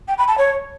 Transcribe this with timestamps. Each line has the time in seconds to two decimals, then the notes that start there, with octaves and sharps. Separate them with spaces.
0.08 G5
0.18 B5
0.28 A5
0.38 C#5